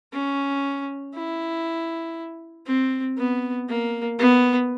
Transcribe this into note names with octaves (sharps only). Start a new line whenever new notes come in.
C#4
E4
C4
B3
A#3
B3